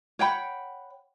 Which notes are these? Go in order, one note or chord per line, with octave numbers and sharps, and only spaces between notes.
C#5 F#5 G5 B5